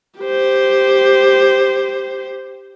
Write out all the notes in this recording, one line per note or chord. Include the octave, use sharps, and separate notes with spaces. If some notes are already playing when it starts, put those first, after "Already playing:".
G4 C5